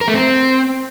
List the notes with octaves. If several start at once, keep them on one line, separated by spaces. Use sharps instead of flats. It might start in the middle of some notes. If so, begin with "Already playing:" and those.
A#4
A3
C4